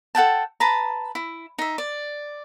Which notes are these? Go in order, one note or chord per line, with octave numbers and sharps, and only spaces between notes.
A4 F#5 G5 A5
B4 A5 A#5
E4
D#4 E5
D5